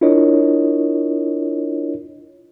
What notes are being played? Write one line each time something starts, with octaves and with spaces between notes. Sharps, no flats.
D4 E4 F4 A#4 C#5 D#5